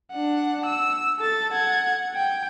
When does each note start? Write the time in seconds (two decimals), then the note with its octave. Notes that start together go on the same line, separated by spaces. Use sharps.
0.12 D4 F#5
0.66 E6
1.19 A4 A6
1.53 F#5 G#6
2.15 G5